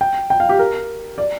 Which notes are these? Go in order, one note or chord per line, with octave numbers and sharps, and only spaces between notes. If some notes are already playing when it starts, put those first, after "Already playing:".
G5
G5
F5
G4
A#4
D5